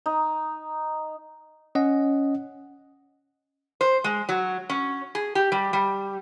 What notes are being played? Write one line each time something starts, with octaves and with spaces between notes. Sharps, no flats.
D#4
C#4 D#5 F#5
C5
G#3
F#3
C#4
G#4
G4
G3
G3